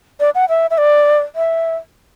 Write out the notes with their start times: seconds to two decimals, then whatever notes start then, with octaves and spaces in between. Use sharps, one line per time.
0.20 D5
0.35 F#5
0.49 E5
0.70 E5
0.78 D5
1.35 E5